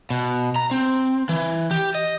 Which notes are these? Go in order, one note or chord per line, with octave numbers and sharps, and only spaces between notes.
B2
A#5
C4
E3
G4
D#5